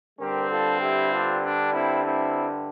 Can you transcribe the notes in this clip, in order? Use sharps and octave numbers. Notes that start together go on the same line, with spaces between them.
G2 D3 G3 C4 G4 A#4
F4 A4
E4 G4
D4 F4
D4
C4 E4
C4 E4